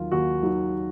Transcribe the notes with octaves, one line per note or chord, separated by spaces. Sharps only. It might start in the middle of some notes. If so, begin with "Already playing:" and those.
Already playing: D#2 D#3 F#3 F4
D#2 F#4
D#3 F#3